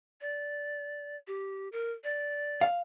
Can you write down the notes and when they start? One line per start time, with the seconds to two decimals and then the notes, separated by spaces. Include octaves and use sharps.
0.21 D5
1.28 G4
1.72 A#4
2.04 D5
2.61 F5